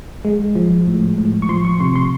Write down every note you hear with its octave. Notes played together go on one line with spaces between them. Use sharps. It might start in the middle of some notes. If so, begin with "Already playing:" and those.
G#3
F3
A2
A2
C#6
F3 C6
C#6
C3 C6
C6